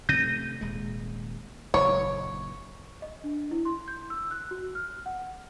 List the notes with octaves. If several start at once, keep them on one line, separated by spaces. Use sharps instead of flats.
C3 A3 G6 A#6 D#7
D#1 G#3
F#1 D#2 A#2 C#5
D#5
D4
E4
C6
G6
E6
F#6
F#4
F6
F#5